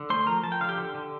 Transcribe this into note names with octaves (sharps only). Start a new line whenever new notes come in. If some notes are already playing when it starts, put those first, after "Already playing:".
Already playing: D3
A3 C5 C6
F3 A#4 A#5
F3 A5
G5
D3 F5
G4 G5
D3
D3